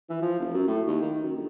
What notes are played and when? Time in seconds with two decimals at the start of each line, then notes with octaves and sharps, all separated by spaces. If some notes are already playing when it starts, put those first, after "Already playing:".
0.09 E3
0.22 F3
0.40 F1
0.54 F#2
0.67 A2
0.87 D#2
1.02 D#3
1.23 F#2
1.36 G1